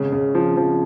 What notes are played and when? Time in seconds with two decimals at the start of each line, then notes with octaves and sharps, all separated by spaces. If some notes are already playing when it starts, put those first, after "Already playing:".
Already playing: G#1 C#3
0.12 C#3
0.35 F3
0.57 F3